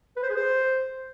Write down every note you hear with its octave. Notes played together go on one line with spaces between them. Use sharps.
B4
C5
G#4
C5